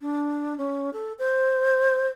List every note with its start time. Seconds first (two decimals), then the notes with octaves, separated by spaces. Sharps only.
0.01 D4
0.58 C#4
0.93 A4
1.19 C5